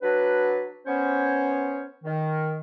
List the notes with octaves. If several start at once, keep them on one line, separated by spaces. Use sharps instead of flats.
F#3 D4 B4
B3 C#4 C5 C#5
D#3